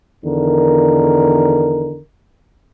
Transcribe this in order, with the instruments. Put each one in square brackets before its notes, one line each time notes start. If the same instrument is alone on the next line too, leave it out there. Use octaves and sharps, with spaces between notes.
[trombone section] E2 D3 D#3 A#4